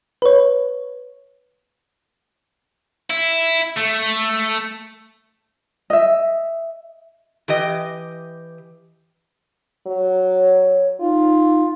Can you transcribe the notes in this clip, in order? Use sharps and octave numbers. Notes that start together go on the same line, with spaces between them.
B4 C#5
E4
A3
D#5 E5
E3 G4 D#5
F#3
C#5
D#4 F4